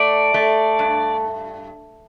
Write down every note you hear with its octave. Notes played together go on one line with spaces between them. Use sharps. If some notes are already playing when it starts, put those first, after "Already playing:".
Already playing: A3 D5
A3
G2